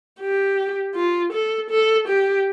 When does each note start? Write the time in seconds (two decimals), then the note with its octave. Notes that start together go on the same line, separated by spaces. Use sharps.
0.20 G4
0.95 F4
1.33 A4
1.70 A4
2.08 G4